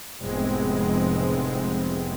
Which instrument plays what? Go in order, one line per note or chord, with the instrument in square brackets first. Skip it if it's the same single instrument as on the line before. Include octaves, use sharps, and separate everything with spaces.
[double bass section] F1 F2 A2 G#3 B3 C4